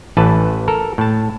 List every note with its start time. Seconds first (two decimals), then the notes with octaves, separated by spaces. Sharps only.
0.17 A1 E3 B4 A5
0.68 A4 A#4
0.98 A2 A5